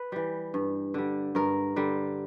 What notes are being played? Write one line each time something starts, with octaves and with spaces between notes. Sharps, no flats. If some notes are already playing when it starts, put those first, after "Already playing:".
Already playing: B4
E3 G3
G2
D3 G3
G2 A#4
D3 G3